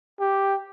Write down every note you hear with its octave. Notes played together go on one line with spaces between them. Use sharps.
G4